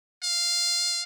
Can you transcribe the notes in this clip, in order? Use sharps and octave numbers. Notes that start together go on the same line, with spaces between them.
F5